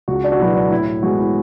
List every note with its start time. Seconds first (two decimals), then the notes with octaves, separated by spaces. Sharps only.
0.08 C#2 F#4
0.24 D4
0.32 F#4
0.39 B2 F#3 B3 E4
0.55 D4
0.70 A2 E4
0.86 E4
1.02 G#3 B3 F#4
1.19 E4